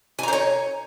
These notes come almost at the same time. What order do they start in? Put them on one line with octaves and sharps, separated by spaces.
G#5 A#5 C5 C#5